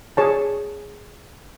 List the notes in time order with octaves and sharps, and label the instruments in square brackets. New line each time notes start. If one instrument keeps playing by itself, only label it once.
[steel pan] G#4 C#5 A5